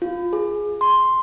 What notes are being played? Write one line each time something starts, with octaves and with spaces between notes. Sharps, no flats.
F4
G#4
C6